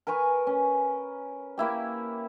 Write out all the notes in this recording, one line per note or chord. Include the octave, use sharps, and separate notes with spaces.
A#4 B4 G#5 C#6
C#4
A#3 E4 G4